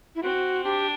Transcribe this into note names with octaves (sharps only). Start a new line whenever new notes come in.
E4
C4 F#4
D4 G4